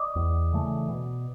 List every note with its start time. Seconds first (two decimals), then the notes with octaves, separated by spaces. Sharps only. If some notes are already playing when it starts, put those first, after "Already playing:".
Already playing: D5 D#5 D6 D#6
0.16 E2
0.53 C#3 E3 A3
0.89 B2